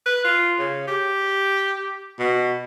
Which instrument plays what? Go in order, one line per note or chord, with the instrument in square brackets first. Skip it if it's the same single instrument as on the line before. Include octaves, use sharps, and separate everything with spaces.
[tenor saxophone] B4
F4
C#3
G4
B2